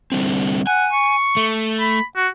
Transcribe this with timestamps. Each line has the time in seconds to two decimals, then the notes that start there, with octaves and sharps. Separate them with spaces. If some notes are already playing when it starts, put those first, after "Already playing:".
0.12 D3 G3 C4
0.67 F#5 G#5
0.93 C#6
1.37 A3
1.80 B5
2.16 F#4